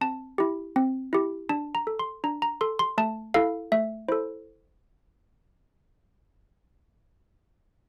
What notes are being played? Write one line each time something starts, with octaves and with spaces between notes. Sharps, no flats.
C4 A5
E4 G4
C4
E4 G4
D4 A5
A#5
A4
C6
D4 A#5
A#5
A4 C6
C6
A3 A5
E4 A4 F5
A3 E5
E4 A4 C5